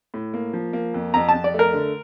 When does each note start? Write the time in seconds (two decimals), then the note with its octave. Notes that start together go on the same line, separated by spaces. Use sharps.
0.14 A2
0.34 A#3
0.53 F3
0.73 A#3
0.94 F2
1.14 F2 A#5
1.29 A5
1.34 F2
1.44 D5
1.54 A3
1.59 A#4
1.74 D3